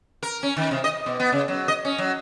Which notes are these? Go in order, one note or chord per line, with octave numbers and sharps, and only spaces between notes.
A#4
C#4
D#3
C3
D#5
B2
B3
C#3
F#3
D#5
C#4
F#3